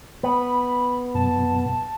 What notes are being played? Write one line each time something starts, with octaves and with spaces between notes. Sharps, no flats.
B3 B5
F#2 B2 A5